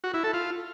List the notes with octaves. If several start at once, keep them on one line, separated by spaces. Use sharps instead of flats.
F#4
E4
A4
F4